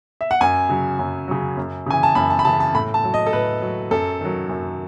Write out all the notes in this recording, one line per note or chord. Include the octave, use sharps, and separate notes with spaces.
E5
F#5
F#2 G#5
C#3 F#3
F#2
C#3 F#3
F#2
C#3 E3 G#5
A5
F#2 B5
A5
B5
C#3 E3 A5
A5
A2 B5
A5
F#3
D#5
A4
A2 B4
F#3
F#2 A4
D#3 F#3
F#2